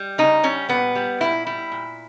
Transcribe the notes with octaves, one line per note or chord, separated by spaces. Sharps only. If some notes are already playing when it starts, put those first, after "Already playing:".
Already playing: G3
C#3 D#4
G3 C#4
A#2 B3
G3
A#2 E4
G3 E4
A#2